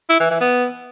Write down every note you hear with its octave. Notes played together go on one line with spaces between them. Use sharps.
E4
E3
E3
B3